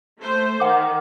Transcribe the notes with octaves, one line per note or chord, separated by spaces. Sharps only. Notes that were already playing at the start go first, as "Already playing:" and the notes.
A3 C5
D#3 F#5 D6